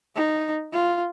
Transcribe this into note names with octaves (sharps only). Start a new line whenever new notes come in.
D#4
F4